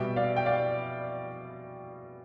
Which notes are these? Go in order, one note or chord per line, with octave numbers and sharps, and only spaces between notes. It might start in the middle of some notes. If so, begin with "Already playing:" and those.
Already playing: B2 G3 B3 E5 G5
D5 F5
G5
D5 F5